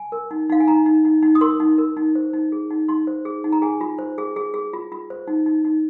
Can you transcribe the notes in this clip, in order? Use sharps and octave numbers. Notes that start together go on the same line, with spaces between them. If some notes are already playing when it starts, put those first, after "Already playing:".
Already playing: G#5
A#4
D#4
D#4 F5
G#5
D#4 A#5
D#4
D#4
D#4
D#6
A#4 C6
D#4
A#4
D#4
C5
D#4
G#4
D#4
D#4 C6
C5
G#4
D#4
A#5
G#4 G#5
F4
C5
G#4
G#4
G#4
F4
F4
C5
D#4
D#4
D#4